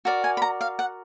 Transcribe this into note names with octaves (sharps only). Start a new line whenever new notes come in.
F#4 A#4 D5
G#5
B5
A#5
F5
F#5